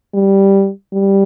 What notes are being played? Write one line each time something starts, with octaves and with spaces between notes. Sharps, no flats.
G3
G3